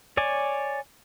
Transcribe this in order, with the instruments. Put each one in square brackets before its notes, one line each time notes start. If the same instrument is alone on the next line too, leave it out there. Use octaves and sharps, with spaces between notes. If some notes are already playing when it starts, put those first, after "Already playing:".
[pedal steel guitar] C#5 D5 G#5